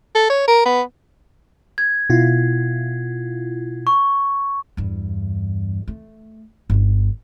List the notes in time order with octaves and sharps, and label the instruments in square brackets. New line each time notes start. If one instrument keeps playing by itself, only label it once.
[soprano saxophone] A4
C#5
A#4
B3
[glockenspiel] G#6
[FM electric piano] B2 E4 F4
[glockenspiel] C#6
[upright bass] E2 G2
A3
G1 D#4